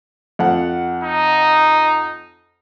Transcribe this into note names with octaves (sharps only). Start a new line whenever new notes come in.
F2 F#5
D#4